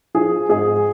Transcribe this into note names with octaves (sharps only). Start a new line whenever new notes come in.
F3 G#4
G#2 G#4